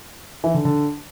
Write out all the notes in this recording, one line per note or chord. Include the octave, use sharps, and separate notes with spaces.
E3
D3
D3